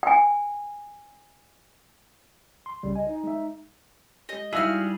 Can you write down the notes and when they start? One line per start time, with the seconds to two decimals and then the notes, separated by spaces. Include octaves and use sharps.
0.03 G5 G#5
2.66 C6
2.83 C2 C#3 G3
2.96 D#5 G#5
3.08 D#4
3.24 G#3 E5
4.29 G#3 G4 D#5
4.53 G3 D#4 E4 F#4 G#4 E5 F5 F6